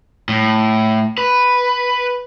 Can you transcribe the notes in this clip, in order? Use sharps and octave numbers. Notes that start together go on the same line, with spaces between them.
A2
B4